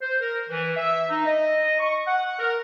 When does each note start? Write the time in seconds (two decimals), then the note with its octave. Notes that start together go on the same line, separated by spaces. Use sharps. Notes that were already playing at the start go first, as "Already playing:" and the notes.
0.02 C5
0.21 A#4
0.50 E3
0.77 E5
1.10 D#4
1.25 D#5
1.79 C#6
2.07 F#5
2.39 A#4